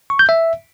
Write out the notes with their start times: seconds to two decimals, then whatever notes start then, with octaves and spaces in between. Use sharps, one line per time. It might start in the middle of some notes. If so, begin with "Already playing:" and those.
0.10 C#6
0.19 G6
0.29 E5